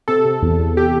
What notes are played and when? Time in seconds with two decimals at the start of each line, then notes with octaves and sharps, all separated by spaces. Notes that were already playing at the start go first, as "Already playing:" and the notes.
0.08 C3 A4
0.25 C3
0.42 E2
0.59 E2
0.77 G4